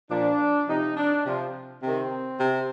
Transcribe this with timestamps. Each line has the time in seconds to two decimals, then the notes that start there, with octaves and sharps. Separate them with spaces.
0.10 A#2 F3 D4
0.68 C3 F3 D#4
0.96 D4
1.26 C3 F3
1.82 C3 D#3 C4
2.40 C3